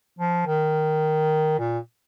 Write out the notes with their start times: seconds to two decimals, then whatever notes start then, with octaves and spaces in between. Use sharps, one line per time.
0.19 F3
0.46 D#3
1.59 A#2